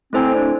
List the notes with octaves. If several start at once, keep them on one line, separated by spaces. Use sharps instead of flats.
A3 C4 E4 A4 C5 G#5
D4